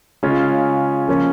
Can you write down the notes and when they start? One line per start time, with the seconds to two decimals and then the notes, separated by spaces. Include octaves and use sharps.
0.23 C#3 G#3 C#4 F4
1.08 C#3 F3 A#3 C#4